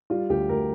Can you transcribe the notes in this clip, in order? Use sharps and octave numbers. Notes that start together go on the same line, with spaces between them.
G3 F4
D2 G4
D2 A#4